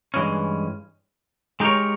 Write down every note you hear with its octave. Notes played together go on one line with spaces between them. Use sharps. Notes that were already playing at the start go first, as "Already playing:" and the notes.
G2 E3 G#3 C#4
G#3 D#4 G4 A#4 C#5